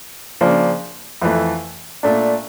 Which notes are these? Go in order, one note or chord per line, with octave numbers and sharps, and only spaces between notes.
C#3 F3 A#3 D4
F2 E3 A3
A#2 A3 D4